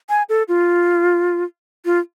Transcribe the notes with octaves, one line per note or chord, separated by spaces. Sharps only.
G#5
A4
F4
F4